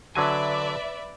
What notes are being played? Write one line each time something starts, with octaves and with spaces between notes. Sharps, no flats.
D3 F#3 B4 D5 E5 G#5